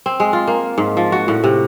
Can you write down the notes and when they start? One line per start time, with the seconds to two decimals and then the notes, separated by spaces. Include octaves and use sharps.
0.06 C4
0.20 G#3
0.33 F4
0.47 A#3
0.78 G#2
0.97 F3
1.12 F#4
1.28 A2
1.44 C3